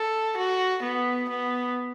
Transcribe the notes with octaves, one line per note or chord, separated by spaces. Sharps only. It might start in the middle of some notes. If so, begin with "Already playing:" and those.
Already playing: A4
F#4
B3
B3